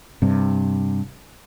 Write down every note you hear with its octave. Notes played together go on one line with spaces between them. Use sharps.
G2 C3